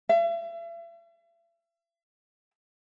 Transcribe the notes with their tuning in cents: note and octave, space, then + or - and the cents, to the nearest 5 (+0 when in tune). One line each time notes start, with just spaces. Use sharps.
E5 +40